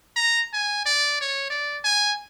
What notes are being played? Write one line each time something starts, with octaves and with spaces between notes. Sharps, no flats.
A#5
G#5
D5
C#5
D5
G#5